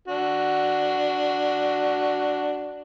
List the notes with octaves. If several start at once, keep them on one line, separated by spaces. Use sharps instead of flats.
D4 F#4